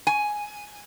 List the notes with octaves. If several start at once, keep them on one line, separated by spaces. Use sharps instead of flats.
G#5